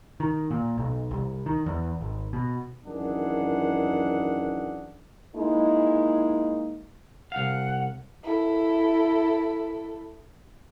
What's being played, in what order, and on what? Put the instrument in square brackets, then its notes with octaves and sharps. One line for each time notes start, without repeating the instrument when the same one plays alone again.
[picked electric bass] D#3
A#2
B1
C2
D#3
E2
G#1
B2
[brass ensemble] F#2 D#3 E3 D4 G#4 F#5
[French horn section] G#3 A#3 D#4 E4
[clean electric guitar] C2 F5 [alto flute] F#5
[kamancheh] E4 A4